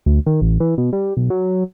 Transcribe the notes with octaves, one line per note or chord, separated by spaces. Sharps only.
D2
D#3
A1
E3
B2
G3
B1
F#3